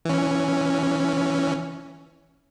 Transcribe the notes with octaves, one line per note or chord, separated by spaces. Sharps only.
E3 C#4